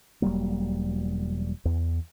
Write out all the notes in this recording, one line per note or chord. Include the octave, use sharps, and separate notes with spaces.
E1 F#3 G3 A#3
E2